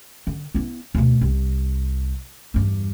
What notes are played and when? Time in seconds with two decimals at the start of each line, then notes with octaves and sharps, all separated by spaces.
0.27 D3
0.55 B3 E4
0.95 D2 B2
1.21 C2
2.54 E2 G2